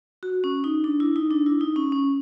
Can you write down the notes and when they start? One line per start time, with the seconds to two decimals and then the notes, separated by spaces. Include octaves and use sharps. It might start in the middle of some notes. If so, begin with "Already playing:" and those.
0.23 F#4
0.44 C#4
0.64 D#4
0.84 D4
1.00 E4
1.16 D#4
1.31 D4
1.46 E4
1.61 D#4
1.76 C#4
1.92 C#4